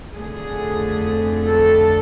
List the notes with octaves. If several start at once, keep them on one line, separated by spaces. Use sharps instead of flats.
F2 D3 A3 G#4
A4